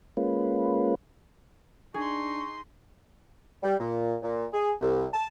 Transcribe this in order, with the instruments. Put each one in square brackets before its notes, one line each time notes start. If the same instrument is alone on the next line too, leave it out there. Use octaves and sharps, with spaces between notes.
[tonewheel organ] G#3 A#3 C#4 F4 B4
[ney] D4 [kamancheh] D#4 C6 [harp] G#4 [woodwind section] C#6
[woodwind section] G3
A#2
A#2
G#4
C2
A5